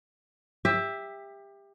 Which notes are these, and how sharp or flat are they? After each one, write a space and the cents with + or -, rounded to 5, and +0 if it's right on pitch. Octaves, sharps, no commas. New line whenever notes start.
G4 +25 E5 +0